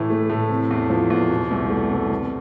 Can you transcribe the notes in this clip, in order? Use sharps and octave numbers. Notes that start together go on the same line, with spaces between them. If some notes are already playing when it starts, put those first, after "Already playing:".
Already playing: A2 E3
A3
A2
C3
E2
F3
E2
B2
C2
A3
C2
C3